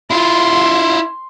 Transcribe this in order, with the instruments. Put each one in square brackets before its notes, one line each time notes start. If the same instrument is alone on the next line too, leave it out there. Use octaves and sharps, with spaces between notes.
[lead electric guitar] E4 F4 [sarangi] C6